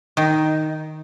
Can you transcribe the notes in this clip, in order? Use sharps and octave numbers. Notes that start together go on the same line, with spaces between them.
D#3 D#4